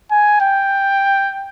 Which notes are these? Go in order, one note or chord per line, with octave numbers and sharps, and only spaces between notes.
G#5
G5